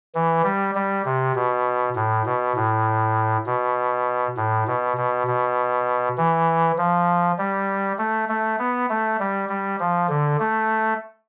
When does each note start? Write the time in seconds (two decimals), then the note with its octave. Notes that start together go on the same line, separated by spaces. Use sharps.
0.15 E3
0.44 G3
0.75 G3
1.05 C3
1.35 B2
1.95 A2
2.26 B2
2.56 A2
3.46 B2
4.37 A2
4.67 B2
4.97 B2
5.27 B2
6.18 E3
6.78 F3
7.38 G3
7.98 A3
8.29 A3
8.59 B3
8.90 A3
9.20 G3
9.49 G3
9.80 F3
10.09 D3
10.40 A3